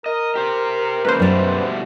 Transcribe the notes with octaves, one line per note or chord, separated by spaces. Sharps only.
A#4 D#5
G4 C5
G#2 C#3 A#3 B4 C5
F#2 B2 G3 A3 D5